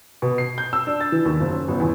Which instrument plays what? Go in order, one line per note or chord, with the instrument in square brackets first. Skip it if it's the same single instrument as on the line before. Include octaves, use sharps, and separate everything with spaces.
[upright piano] B2
C7
G6
E6
D4
A6
E3
D#2
F#1
C#4
G1
E2